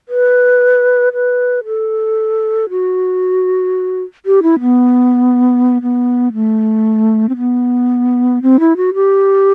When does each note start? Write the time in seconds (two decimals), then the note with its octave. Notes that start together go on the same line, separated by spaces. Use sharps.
0.09 B4
1.13 B4
1.65 A4
2.70 F#4
4.26 G4
4.43 E4
4.61 B3
5.82 B3
6.33 A3
7.29 C4
7.37 B3
8.42 C4
8.60 E4
8.77 F#4
8.94 G4